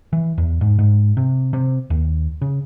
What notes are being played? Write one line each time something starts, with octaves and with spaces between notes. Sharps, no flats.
E3
E2
G#2
G#2
C3
C3
D#2
C#3